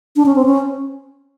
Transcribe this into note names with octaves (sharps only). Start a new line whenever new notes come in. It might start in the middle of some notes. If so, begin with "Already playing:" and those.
D4
C#4
C4
C#4